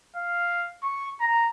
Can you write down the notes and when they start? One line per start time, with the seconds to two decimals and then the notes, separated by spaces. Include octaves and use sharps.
0.16 F5
0.83 C#6
1.21 A#5